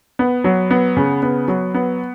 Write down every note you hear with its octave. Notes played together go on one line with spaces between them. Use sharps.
B3
F#3
B3
C#3
B3
F#3
B3